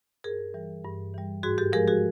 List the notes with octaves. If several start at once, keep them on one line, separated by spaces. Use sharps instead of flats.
G2 G#4 A#4
E3 G3
G2
E3 G3
G#2 F#4 G#4
G4 A4
F3 G#3 G#4 A#4
F#4 G#4